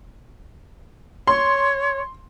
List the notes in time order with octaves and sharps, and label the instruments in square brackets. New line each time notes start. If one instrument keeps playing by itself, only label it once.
[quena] C#5 [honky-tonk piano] C6